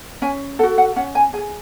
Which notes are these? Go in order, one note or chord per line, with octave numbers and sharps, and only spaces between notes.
C#4 G#5
F#4 A4 F#5
F#5
C#4 F#5
G#5
G#4 G#5